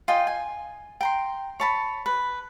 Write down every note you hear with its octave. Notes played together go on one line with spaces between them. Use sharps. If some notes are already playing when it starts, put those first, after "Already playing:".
F4 D#5 G5 G#5
G#5
G5 A#5 C6
C#5 A5 B5
B4